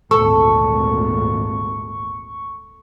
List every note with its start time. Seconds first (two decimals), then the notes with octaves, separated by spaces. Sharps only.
0.11 G#1 D2 A#2 A4 C#6